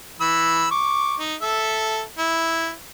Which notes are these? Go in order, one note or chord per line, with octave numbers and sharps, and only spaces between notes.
E3 B5 E6
C#6 D6
D#4
A4 E5
E4